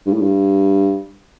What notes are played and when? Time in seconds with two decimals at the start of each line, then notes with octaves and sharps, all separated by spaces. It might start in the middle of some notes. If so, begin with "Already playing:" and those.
0.06 G2
0.13 A2
0.21 G2